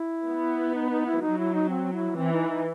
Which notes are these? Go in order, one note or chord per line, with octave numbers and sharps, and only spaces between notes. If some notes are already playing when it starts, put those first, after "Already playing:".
Already playing: E4
B3
D#4
D#4
E4
F#3 D#4
E4
D#4
C4
E4
E3 C4
D#4
D#4